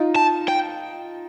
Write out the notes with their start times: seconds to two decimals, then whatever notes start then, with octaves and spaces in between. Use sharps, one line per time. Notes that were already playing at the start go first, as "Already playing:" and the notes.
Already playing: D#4 F4
0.16 A5
0.48 G5